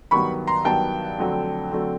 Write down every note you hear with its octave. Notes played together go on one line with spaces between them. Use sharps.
G2 D#3 F#3 B3 B5 C#6
A#5 C6
G2 D#3 F#3 B3 G5 A5
F2 D3 F#3 A3 C4
D3 F#3 A3 C4